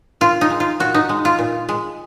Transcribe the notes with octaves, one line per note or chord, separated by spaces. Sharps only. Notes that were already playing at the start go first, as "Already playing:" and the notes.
A#2 F4
D#4
G#3
F4
A#2 F#4
D#4
G#3
F4
A#2
G#3